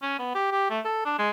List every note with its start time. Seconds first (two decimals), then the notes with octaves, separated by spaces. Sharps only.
0.03 C#4
0.19 B3
0.35 G4
0.52 G4
0.70 A3
0.85 A4
1.05 D4
1.19 G#3